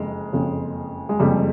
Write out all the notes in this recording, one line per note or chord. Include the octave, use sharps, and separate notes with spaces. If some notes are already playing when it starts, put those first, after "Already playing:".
Already playing: F#1 F2 G#3
F#1 F2 C#3
G#3
F#1 F2 C#3 G3